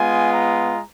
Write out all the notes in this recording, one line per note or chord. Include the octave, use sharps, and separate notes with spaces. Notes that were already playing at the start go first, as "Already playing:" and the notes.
Already playing: G#3 B3 F4 G#5
A#5